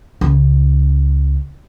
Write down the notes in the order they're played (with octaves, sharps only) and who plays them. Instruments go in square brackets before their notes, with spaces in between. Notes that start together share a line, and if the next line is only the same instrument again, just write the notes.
[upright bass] C#2 C#4